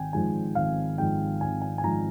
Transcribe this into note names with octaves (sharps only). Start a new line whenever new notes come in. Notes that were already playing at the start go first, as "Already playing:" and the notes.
Already playing: G#1 G5 G#5
G#2 F3 G#3 D#4 G#5
G#1 F5
G#2 F3 G#3 D#4 G5
G#1 G#5
G#5
G#5
G#2 F3 G#3 D#4 A#5